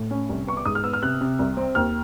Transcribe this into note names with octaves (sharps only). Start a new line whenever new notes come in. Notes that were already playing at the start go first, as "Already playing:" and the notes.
Already playing: A2
C#4
C2
B3 C#6
D6
G#2 D#6
F6
B3 E6
F6
C3 F#6
C3
C2
C4
D#2 F6